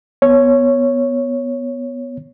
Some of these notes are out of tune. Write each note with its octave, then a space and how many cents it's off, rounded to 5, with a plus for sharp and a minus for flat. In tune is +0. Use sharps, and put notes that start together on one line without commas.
B3 +0 C#5 +0